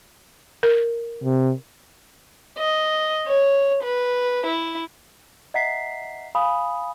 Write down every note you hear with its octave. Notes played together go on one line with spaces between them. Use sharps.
A#4
C3
D#5
C#5
B4
E4
D#5 E5 F#5 A#5 B6 C7
F5 G#5 B5 D#6